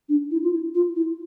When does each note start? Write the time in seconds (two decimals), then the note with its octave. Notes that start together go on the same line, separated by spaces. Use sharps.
0.09 D4
0.31 E4
0.43 F4
0.52 E4
0.74 F4
0.96 E4